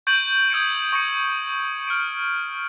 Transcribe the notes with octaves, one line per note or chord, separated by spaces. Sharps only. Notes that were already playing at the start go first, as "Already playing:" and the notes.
C#6 G6 A6 D7 D#7 F#7
D#6 E6 G6 G#6 C#7 D7
C#6 C#7
F6 C#7 D7